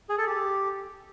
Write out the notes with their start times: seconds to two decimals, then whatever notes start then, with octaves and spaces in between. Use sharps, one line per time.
0.09 G#4
0.18 A4
0.27 G4